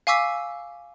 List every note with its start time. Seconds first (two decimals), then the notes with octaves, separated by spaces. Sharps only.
0.07 F5 G#5 C#6 D6 E6 B6